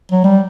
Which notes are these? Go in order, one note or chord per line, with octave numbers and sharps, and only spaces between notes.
F#3
G3